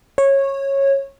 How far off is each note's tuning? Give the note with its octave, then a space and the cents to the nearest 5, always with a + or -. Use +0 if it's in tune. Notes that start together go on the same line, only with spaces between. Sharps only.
C#5 -15